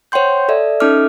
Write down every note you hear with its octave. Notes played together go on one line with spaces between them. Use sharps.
C5 C#5 F#5 G5 C6 G6
A4 D5 E5
C#4 D#4 A4 E5 D6 F6